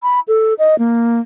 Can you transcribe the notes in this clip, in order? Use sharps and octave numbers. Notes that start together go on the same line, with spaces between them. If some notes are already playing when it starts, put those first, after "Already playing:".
B5
A4
D#5
A#3